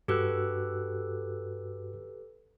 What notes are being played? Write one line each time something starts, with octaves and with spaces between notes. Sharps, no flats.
G2 F#4 G4 A4 B4 F#6